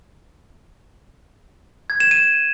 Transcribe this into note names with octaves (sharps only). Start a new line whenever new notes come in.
G#6
E7
D#7